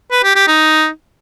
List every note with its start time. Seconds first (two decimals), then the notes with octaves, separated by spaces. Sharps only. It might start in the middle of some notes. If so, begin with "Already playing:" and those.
0.12 B4
0.24 G4
0.35 G4
0.47 D#4